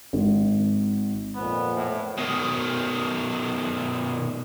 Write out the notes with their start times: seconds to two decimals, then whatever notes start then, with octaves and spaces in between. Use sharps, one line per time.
0.13 G#1
1.36 F2 A#2 B3 B4 C5
1.75 A2
2.18 B2 D#3